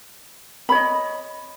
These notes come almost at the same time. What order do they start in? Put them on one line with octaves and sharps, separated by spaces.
B5 C#5 D#5